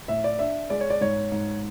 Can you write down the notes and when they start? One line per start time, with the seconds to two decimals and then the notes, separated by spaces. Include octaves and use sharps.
0.08 A2 E5
0.24 D5
0.39 D4 E5
0.70 G#3 D5
0.81 C#5
0.90 D5
1.01 G#2 C#5
1.32 G#2